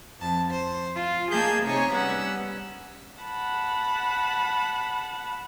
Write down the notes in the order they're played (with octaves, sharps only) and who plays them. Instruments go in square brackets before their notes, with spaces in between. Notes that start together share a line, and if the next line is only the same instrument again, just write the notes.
[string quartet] F2 A5
C5
F4
A#3 G#4 D#5 A5 G6 G#6
C3 D#4 C#5 G#5 A#5 C#6
G3 B3 C#4 F#5 E6
F#5 A5 B5